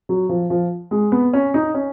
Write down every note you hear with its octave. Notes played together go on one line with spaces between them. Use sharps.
F#3
F3
F3
G#3
B3
C#4
D#4
C#4